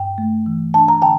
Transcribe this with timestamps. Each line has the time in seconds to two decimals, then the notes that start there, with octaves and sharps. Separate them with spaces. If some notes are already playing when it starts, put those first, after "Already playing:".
Already playing: G2 G5
0.18 A3
0.46 E3
0.74 D4 A5
0.88 A#5
1.02 D3 G5 A5